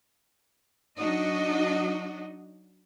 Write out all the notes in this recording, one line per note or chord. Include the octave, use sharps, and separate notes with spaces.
F#3 D4 D#4 F#4 D#5